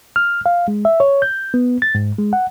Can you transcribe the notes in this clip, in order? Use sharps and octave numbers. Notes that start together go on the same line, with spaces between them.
F6
F5
G#3
E5
C#5
G6
B3
A6
G#2
G#3
F#5